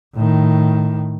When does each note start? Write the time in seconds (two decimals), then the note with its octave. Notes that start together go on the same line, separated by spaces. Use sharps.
0.15 A2 D#3